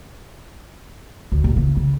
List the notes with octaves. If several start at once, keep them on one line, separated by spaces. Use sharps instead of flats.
D2
D#1
C#2
C#3